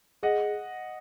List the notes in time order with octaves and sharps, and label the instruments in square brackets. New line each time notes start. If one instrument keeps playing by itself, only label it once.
[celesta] G#4 [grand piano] D#5 F#5